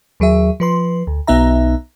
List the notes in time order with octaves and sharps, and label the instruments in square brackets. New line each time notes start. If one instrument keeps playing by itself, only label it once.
[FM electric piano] D#2 F#3 G#4 E5
F3 B4 C6
D2
B1 B3 D#4 E5 A#5